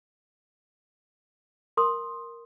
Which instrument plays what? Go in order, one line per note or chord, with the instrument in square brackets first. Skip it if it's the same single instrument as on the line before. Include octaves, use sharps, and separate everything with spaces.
[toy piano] A#4 C6 D#6